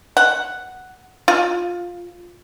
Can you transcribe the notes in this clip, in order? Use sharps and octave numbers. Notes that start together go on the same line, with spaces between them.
F#5
F4